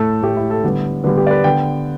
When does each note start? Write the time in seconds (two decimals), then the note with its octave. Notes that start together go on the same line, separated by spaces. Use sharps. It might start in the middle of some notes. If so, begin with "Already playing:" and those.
Already playing: A2 A3 A4
0.22 A2 A3 G4
0.37 E4
0.50 A4
0.64 D3 G3 B3
1.04 D3 G3 B3 B4
1.17 G4
1.27 D5
1.31 B4
1.44 D3 B3 G5